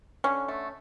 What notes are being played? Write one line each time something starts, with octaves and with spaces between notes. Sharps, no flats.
D3 C#4
A3